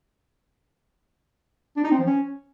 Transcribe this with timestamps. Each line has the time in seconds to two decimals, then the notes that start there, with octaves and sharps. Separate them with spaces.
1.77 D4
1.84 D#4
1.91 C4
1.99 F3
2.06 C#4